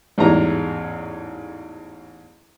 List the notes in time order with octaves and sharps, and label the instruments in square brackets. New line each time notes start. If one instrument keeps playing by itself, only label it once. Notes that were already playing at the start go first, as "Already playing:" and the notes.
[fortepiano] A1 E2 G#2 G3 A#5